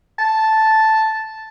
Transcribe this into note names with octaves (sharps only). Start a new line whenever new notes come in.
A5